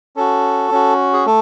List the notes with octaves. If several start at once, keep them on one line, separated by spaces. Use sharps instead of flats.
C#4 F#4 A4
C#4 F#4
G#4
A3 A4